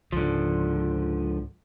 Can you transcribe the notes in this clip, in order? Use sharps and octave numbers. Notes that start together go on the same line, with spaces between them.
C#2 G#2 D3 F3